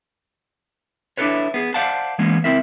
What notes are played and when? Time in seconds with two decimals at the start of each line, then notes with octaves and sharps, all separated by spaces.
1.17 D4 E4 F4 A4 B4 C#5
1.54 B3 G#4
1.74 C5 D5 F5 F#5 A5
2.19 E3 G#3 A#3 B3 C#4
2.44 C#2 C4 E4 A#4 E5